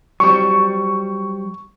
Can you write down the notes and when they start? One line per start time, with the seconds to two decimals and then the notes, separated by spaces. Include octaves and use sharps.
0.20 F#3 G3 C4 C#6